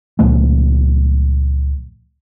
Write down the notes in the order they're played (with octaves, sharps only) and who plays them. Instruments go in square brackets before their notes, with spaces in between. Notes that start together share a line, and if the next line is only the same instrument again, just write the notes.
[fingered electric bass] C#2 A#2 F3 A3